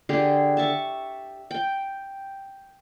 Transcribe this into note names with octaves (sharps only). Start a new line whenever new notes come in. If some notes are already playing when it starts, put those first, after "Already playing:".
D3 G4 G#4
E5 A5 C#6
G5